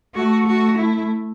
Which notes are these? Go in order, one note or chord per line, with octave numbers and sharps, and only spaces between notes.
A3 F#4
F#4
E4